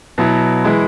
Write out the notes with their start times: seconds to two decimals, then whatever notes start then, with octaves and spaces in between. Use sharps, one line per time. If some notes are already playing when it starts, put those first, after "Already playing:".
0.18 B2 F#3 E4
0.64 E3 G#3 E4